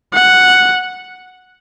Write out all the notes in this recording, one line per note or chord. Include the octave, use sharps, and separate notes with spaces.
F#5